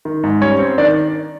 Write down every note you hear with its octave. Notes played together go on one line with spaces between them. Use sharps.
D#3
G#2
G3 C#4 C#5
C4
D#3 D4 D5